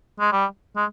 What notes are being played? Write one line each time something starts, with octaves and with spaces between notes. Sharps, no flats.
G#3
G3
G#3